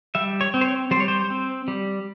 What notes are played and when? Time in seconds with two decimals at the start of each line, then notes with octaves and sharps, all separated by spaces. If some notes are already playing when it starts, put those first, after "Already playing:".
0.15 G3 E5
0.41 C#5
0.54 C4
0.61 C5
0.65 C#5
0.91 G3 C5
1.00 C#5
1.08 C5
1.30 C4
1.68 G3